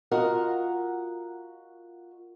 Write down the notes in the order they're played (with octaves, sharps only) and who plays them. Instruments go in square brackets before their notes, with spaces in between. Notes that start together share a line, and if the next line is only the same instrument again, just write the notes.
[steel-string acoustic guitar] F4 F#4 A#4 D#5 F#5